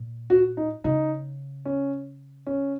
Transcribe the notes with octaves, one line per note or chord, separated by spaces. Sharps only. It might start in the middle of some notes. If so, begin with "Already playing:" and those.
Already playing: A#2
F#4
D#4
C#3 D#4
C#4
C#4